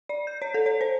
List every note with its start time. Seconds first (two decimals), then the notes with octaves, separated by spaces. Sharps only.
0.09 D5
0.27 G6
0.42 C#5
0.54 A4
0.66 C#5
0.81 C5